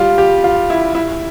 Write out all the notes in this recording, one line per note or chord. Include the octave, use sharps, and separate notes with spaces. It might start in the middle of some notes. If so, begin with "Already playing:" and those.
Already playing: G3 F4
G4
F4
E4
E4